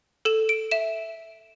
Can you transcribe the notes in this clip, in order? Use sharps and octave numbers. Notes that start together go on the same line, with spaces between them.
A4 E7
D7
E5 E7